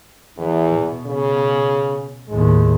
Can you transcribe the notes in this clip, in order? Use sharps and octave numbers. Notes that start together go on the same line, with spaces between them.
E2 E3
B2
C#3
D#2 A2 G#3